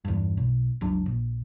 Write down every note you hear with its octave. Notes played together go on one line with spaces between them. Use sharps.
E2 G2
B1
F#1 C#2 F#3 D4
A#1